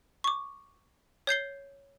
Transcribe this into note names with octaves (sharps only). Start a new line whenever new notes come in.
C#6 D6
C#5 G6 C7 G7